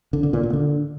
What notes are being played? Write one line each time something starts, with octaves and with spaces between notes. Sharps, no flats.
D3
D3
A#2
A#2
D3